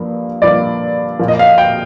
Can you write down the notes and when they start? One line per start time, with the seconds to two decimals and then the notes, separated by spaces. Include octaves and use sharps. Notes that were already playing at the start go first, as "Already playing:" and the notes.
Already playing: G2 F3 A#3
0.42 G2 F3 A#3 D5
1.19 A#2 F3 A#3
1.28 D#5
1.39 F5
1.58 G5